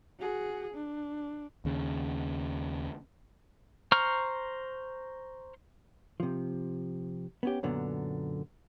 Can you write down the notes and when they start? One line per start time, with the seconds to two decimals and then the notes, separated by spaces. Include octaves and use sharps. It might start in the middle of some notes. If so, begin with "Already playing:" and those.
0.20 F#4 G#4
0.74 D4
1.65 D#2 C#3
3.92 C5 A#5 C#6 F6
6.20 C3 F3
7.43 B3 C#4 G4
7.63 F#2 A#2 D3 B3